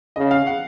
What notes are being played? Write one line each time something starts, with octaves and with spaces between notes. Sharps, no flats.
C#3 D#5
F5
F#5